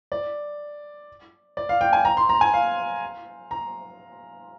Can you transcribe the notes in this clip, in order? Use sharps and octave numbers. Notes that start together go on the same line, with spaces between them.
D5
D5
F5
G5
G#5
A#5
C6
A#5
G#5
F5
A#5